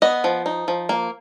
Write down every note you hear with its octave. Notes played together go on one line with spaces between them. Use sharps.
B3 D#5
F3
D#4
F3
A#3